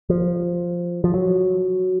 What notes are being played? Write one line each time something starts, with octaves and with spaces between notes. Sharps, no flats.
F3
F3
F#3